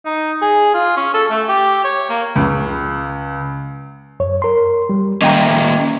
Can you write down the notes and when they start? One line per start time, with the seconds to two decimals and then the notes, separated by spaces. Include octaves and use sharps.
0.06 D#4
0.42 G#4
0.74 F4
0.97 C#4
1.14 A4
1.30 A3
1.49 G4
1.84 C#5
2.09 A#3
2.36 C#2
4.20 F#2 C#5
4.42 A#4 C6
4.89 G3
5.22 D#3 A#3 C#4 D#5 G5 A#5